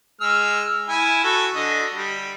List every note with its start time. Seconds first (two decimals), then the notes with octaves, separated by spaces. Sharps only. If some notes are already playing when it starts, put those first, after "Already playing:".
0.21 G#3 E6 F6
0.89 E4 G#5
1.24 F#4 A4
1.55 D3 D#5
1.93 G3